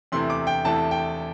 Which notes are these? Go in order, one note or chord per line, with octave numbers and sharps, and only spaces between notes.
E2 C3 E3 A3 E4 C6
D6
G5
E2 C3 E3 A3 E4 A5
G5